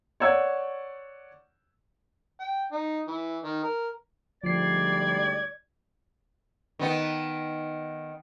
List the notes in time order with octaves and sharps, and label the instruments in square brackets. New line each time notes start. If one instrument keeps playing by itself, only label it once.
[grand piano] C#5 D5 F#5 E6 G#6
[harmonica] G5
D#4
E3
D#3
A#4
[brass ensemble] D2 G#2 G3 [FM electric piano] F3 C7 [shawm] D5 [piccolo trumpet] G#6
[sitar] D#3 B3